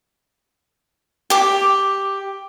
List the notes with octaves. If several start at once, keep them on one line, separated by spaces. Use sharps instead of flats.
G4 D6